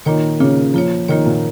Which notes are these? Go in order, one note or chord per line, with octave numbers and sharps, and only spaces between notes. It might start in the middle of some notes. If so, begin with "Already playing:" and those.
A#2 D#3 A#3 F4 C#5
A#2 C#3 A#3 F4 C#5
F3 A#3 F4 C#5
D#3 A#3 F4 C#5
A#2